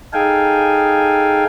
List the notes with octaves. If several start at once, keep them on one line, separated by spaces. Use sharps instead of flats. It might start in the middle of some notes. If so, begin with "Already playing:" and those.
D#4 G#4 A4 F5 G5 G#5